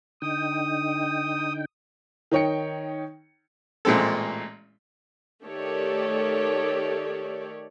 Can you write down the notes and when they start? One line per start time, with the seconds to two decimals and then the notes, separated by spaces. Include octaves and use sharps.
0.22 D3 D#4 G5 D#6
2.31 D#3 D#4 C#5 G5 C#7
3.85 A1 A#2 G#3 C4 A4
5.46 D#3 A3 G4 A4 C#5 D5